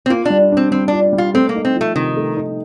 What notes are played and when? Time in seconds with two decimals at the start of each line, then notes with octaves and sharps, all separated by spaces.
0.06 C4
0.10 A#3 F4
0.25 G3 D4
0.52 C4 D4
0.72 G3 C4
0.88 D4 F4
1.13 G3
1.18 F4
1.34 A3 C4
1.49 A#3
1.55 D#4
1.65 C4
1.75 F3
1.81 A3
1.95 C3 D#3
2.17 A3
2.37 D#4